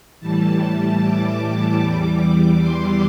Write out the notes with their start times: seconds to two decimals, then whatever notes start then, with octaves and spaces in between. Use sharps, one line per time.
0.20 A2 E3 G3 A5
1.00 D6
1.81 E2 E3 G3
2.60 C6